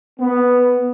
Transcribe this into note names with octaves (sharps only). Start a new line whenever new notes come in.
B3